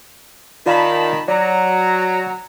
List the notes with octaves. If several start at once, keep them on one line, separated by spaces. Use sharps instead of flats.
D#3 F4 D5 F5 A5 B5
F#3 D5 A#5